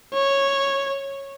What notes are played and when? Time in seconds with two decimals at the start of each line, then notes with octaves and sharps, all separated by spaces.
0.14 C#5